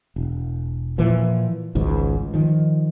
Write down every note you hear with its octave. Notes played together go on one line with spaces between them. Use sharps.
E1
A#2 E3 F3
G#1 C#2 G#2
D#3 F3